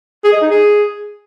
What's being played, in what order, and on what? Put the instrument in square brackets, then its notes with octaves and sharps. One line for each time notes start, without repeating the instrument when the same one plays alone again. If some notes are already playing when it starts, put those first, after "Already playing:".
[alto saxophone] G#4
D#5
D#4
G#4